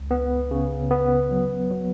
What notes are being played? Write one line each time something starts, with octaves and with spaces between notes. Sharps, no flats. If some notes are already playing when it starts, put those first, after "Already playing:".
Already playing: C#2
B3
C#3
B3
F#3
F#3